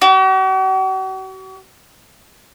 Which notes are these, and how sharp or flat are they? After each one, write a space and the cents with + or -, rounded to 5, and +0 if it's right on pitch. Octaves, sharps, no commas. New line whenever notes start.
F#4 +45